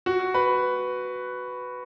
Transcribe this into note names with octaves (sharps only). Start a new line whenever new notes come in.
F#4
B4